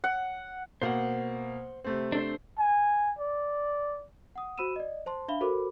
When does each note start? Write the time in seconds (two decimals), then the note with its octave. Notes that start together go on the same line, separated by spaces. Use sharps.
0.04 F#5
0.82 B2 A#3 C5 F#5
1.84 C3 A3 C4
2.12 D4 A4 C5
2.58 G#5
3.19 D5
4.36 F#5 D#6
4.58 F#4 C5 B5 E6 D#7 E7
4.76 D5 D#5
5.06 C5 A5 C6
5.28 D4 E5 F5 B5 G7
5.41 F#4 A4 A#4 C5 B5 D6